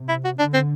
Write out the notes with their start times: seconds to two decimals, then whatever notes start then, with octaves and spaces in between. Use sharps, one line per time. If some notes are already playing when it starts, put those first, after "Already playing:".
Already playing: C3
0.09 E4
0.25 F#4
0.39 D3 D4
0.54 C4